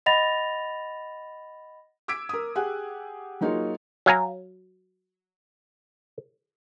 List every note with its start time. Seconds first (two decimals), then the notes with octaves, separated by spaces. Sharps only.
0.06 D#5 F#5 B5 A6 A#6 F7
2.08 D6 E6 G#6 B6 D7
2.29 A#4 D#6
2.55 G4 G#4 F#5 G#5 F#6
3.41 F#3 A#3 D#4 F4 G#4 C#5
4.06 F#3 F5 G#5 A#5